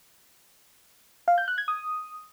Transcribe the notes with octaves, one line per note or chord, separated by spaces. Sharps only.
F5
G6
F#6
G#6
D#6